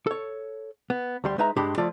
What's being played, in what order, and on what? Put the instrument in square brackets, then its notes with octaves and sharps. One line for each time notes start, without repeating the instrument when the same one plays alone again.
[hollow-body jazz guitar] A4 C#5
B3
D2 G3 C6
G#3 D#4 B4 E5 A#5
G2 G#3 D4 G4 B5 C6
F3 A3 F4 D5